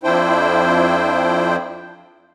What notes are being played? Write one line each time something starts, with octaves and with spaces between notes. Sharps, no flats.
F2 F3 D4 E4 C5 G5